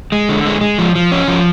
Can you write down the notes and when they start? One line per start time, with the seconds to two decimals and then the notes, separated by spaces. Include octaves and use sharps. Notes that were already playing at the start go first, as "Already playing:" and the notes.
0.12 G#3
0.29 D3
0.46 G#3
0.61 G#3
0.79 F3
0.95 F3
1.12 C#4
1.28 F3